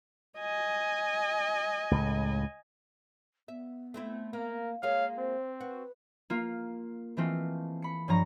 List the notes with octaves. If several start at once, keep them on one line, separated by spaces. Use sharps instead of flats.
D#5 G#5
C#2 A2
B3 E5
A3 C4 E4
A#3 A#4
G#3 A#3 F4 C#5 F5
C4 C5
F#4 B4
A#3 F4
E3 G#3 A3 C4 F4
B5 C#7
G2 F3 C#5 A#5